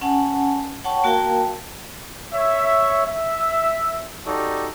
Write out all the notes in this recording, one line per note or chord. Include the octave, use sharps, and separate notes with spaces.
C#4 F#5 G#5 A5
C#5 F#5 G5 A5 C#6
A#3 F#4 A#4 F5 G5 A5
C#5 E5
E5
D#4 F#4 G4 A4 D5